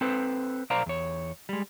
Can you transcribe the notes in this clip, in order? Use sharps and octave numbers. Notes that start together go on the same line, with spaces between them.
C4 A4 B4 C5
B1 A#4 C5 D5 F5 A#5
E2 C#5
G3 G#3